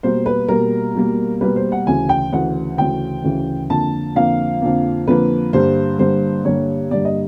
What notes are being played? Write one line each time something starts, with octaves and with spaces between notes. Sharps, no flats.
B2 G3 A#3 C5
B4
B2 G3 A#3 A#4
B2 G3 A#3
B2 G3 A#3 B4
C5
F#5
D2 C#3 E3 G#5
G5
D2 C#3 E3 F#5
D2 C#3 E3 G5
D2 C#3 E3
F2 D3 F3 A#3 A5
F2 D3 F3 A#3 F5
F2 D3 F3 A#3
F2 D3 F3 A#3 B4
G2 D3 G3 A#3 C5
G2 D3 G3 A#3 C5
G2 D3 G3 A#3 C#5
G2 D3 G3 A#3 D5
D#5